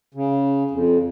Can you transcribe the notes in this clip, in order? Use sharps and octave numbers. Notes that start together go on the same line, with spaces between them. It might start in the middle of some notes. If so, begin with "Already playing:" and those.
C#3
F2